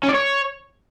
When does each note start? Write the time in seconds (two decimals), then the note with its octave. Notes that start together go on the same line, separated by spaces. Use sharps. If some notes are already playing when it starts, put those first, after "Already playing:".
0.03 C#4
0.09 D5
0.14 C#5